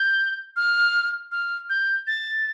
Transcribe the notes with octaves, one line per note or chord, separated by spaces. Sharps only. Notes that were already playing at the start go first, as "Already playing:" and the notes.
Already playing: G6
F6
F6
G6
A6